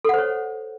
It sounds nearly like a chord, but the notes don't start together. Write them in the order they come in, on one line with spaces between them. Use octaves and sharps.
A4 F#5 C5 C#5